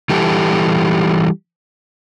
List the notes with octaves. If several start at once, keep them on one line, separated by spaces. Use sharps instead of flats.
E3 G3 G4 A4